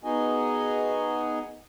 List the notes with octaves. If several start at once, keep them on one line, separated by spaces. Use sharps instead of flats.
B3 D#4 F#4 G#4 D#5 G#5